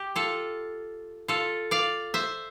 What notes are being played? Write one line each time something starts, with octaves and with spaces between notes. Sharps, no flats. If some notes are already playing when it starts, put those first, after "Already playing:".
Already playing: G4
F4 A4
F4 A4
D5 F5
C5 E5